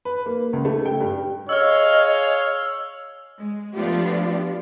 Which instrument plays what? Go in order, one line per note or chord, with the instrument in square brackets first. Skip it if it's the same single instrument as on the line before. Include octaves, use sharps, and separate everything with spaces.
[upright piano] B4
A#3
C#2
A3
G5
G2
[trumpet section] G#4 F5 [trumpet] C#5 [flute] D#5 [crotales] E6 F6
[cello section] G#3
F3 A3 B3 D4 F4 G4